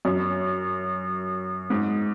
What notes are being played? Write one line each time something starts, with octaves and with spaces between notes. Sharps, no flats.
F#2
G#2